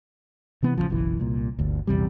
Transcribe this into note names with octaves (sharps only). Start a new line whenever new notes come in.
C3 E3 B3
A1 G2 C#3 F3
F#1 B1 E3
C2 A#2
G1 D2
A#1 E2 C3 G3